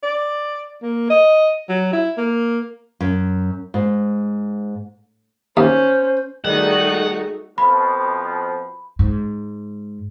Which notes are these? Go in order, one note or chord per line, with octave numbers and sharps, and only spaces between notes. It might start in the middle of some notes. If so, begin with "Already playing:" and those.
D5
A#3
D#5
F#3
E4
A#3
F#2
G#2
D#2 C#4 C5
D#3 G3 A3 D#4 F#4 G#4 F#5
F2 B2 F3 B5
G#2